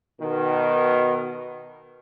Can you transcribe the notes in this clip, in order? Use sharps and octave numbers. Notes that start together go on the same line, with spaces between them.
B2 D#3